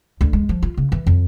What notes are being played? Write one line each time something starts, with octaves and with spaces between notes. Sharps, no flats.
D2
G#3
F3
F4
C#3
E3
F2